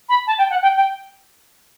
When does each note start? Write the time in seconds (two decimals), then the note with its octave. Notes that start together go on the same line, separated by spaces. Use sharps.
0.09 B5
0.27 A5
0.38 G5
0.50 F#5
0.62 G5
0.76 G5